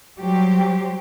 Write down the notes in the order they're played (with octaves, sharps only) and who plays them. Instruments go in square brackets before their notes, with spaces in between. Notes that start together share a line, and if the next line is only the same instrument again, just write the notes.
[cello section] F#3 G3 G4 C5